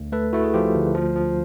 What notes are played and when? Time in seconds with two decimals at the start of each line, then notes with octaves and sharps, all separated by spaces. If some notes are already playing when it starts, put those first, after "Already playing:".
Already playing: D2
0.12 A3 A4 B4
0.33 A3 E4 F#4
0.44 G#4
0.54 F3 F4 G4
0.75 D2
0.95 F3
1.16 F3